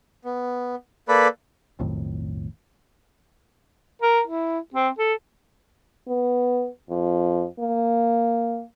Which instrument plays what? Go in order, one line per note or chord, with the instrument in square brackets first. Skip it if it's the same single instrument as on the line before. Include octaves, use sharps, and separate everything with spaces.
[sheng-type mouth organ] B3
A#3 A4 B4 D5 B5
[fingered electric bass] B1 F2 A2 D#3
[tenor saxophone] A#4
E4
C4
A4
[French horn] B3
F2
A#3